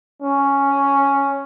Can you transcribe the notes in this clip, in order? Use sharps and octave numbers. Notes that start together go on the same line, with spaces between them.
C#4